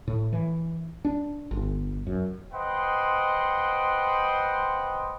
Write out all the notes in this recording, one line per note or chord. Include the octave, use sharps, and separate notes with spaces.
A2
E3
D4
G1
F#2
B4 C5 D#5 F#5 G5 C6